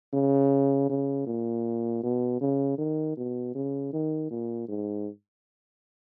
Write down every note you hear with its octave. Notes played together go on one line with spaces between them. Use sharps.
C#3
C#3
A#2
B2
C#3
D#3
B2
C#3
D#3
A#2
G#2